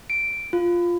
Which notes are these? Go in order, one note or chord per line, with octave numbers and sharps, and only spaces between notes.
D7
F4